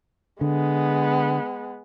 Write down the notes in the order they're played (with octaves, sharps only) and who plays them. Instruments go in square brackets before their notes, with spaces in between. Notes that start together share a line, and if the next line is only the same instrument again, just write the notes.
[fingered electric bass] D3 [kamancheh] G#3 B3